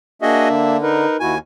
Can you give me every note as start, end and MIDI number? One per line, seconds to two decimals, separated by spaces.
0.22 0.77 58
0.22 0.77 62
0.22 0.48 66
0.22 0.48 68
0.22 0.48 75
0.22 0.77 76
0.49 1.06 50
0.82 1.17 63
0.82 1.17 70
0.82 1.17 71
1.20 1.38 39
1.20 1.34 64
1.20 1.34 66
1.20 1.38 80